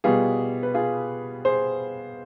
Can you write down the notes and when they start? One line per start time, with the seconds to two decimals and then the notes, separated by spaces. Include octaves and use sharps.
0.04 B2 G3 B3 F4 G#4
0.63 B4
0.74 F4 G#4
1.45 G#4 C5